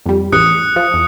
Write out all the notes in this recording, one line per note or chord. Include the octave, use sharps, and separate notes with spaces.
F2 G3
A1 E2 D#6 F#6 C#7
F3
E2